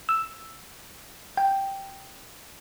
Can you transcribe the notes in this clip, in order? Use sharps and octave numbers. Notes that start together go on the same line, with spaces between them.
E6
G5